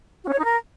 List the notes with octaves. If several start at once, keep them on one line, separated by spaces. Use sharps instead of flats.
F#4
C#4
C#5
D#4
A#4